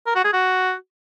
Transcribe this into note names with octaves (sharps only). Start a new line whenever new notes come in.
A#4
F#4
G#4
F#4